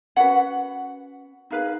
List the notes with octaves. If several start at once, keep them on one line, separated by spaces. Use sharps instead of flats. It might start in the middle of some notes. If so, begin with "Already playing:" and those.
C#4 F#4 B4 F#5
D#4 G#4 B4 F5